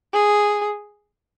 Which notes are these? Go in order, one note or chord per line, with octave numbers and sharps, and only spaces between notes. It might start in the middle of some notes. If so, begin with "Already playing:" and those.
G#4